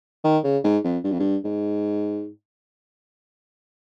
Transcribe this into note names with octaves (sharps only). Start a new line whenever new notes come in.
D#3
C#3
G#2
F2
G2
F2
G2
G#2